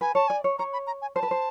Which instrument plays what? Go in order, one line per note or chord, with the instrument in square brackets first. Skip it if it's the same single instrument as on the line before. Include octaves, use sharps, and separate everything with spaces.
[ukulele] B4 [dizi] G#5
[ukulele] C#5 [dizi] A5
[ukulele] D5 [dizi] G#5
[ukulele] C#5
[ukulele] C#5 [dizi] A#5
[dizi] B5
A#5
G#5
[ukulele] C5 [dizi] A5
[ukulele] B4
C5